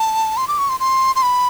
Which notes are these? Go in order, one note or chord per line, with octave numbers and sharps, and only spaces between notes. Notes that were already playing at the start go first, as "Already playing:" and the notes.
Already playing: A5
C6
D6
C#6
C6
C6
C6
B5